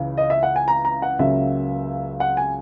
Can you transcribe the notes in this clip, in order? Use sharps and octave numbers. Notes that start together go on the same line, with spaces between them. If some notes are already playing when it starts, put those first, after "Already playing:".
Already playing: C#2 C#3 E3
D#5
E5
F#5
G#5
A#5
A#5
F#5
C#2 C#3 F#3 A#3 E5
F#5
G#5